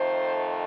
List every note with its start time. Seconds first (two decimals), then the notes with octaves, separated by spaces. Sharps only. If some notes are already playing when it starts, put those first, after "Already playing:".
Already playing: F2 D#3 A3 C5